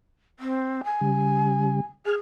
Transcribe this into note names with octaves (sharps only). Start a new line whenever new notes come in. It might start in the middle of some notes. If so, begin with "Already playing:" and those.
C4
G#5
C#3 G3
G#4 G#5 F6